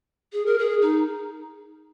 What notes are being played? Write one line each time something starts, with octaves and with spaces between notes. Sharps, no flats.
G#4
A#4
G#4
D#4